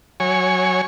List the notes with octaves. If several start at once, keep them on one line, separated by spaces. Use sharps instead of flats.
F#3 C#5 G#5